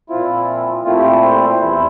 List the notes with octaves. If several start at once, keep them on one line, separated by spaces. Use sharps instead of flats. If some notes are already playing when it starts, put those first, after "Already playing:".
A#2 F3 C4 E4 F4
A#2 A3 C4 E4 F4
G4
A4
C5
E2 E3 G3 C4 E4